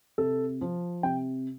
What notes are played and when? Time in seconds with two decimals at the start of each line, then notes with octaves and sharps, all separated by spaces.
0.18 C3 A4
0.61 F3
1.03 C3 G5